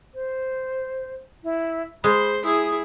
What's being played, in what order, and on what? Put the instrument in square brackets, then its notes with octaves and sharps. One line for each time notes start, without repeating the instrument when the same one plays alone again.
[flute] C5
E4
[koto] G#3 [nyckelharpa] C5 [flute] B5
[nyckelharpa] E4 G#4 [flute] D#6